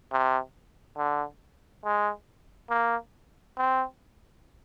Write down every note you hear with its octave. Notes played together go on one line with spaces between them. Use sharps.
C3
D3
G#3
A#3
C4